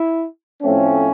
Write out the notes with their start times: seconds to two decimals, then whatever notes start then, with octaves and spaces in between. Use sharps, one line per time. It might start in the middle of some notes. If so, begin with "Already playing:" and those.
Already playing: E4
0.63 A2 F3 A3 C4 C#4